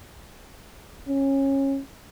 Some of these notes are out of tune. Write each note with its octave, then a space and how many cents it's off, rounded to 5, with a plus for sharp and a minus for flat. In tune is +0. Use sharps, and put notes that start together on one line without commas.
C#4 -20